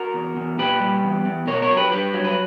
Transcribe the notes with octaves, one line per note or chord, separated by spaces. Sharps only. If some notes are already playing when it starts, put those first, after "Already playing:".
Already playing: F#4 A#4
E2
E2
A#2 G4 B4
G3
E2
E2
B2 A#4 C#5
A#4 C#5
F#3
G4 B4
G2 G4 B4
F#3
B4